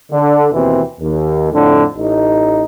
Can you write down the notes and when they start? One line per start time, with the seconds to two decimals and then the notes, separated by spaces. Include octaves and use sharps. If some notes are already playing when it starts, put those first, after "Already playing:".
0.12 D3
0.53 D#2 B2 E3 C4
1.00 D#2
1.52 F2 A2 D3
1.97 A1 D#4